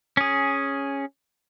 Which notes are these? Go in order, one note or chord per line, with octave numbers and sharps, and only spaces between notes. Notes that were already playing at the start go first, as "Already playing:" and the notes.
C#4 G#4